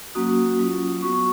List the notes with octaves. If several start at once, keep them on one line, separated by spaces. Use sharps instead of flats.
F#3 A#3 C#4 F#4 D#6
F#3 C#4 F4
F#3 B3 F#4 C#6